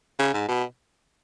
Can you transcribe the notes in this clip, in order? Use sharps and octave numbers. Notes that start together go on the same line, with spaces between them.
C#3
G#2
B2